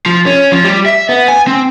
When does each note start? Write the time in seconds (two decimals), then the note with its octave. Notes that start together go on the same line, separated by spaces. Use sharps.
0.06 F3
0.26 C#4
0.52 F3
0.64 G3
0.86 E5
1.09 B3
1.28 G#5
1.47 C4